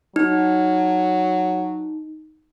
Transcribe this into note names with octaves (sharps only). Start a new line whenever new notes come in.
F#3 D#4